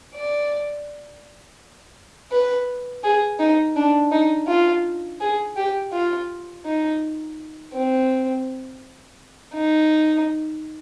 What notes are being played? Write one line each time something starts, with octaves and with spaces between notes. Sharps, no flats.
D5
B4
G#4
D#4
D4
D#4
F4
G#4
G4
F4
D#4
C4
D#4